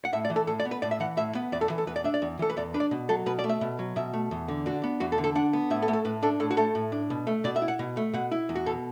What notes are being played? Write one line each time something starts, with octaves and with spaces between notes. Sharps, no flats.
F#5
A2 E5
D5
E3
A4
A2 A4
D5
B3
B4
A2 D5
E5
E3 F#5
A2 E5
B3 B4
E2 D5
A4
E3
A4
E2 B4
D5
D4 E5
D5
E2
E3 A4
B4
E2 D5
D4 B4
D5
B2
F#3 A4
B2 B4
D5
A3
E5
B2
F#3
B2 E5
A3
E2
D3
D4 F#4
B3
E2 F#4
A4
D3
A4
D4 F#5
B3
A2 E5
A4
A3
A4
A2 B4
D4 A4
A2 A4
F#4
A3 A4
A2
D4
B2
A3
B2 D5
E5
E4
F#5
B2
A3
B2 F#5
E4
E2
F#4
B2 A4